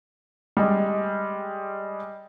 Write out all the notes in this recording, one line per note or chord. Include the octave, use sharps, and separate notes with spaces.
G3 G#3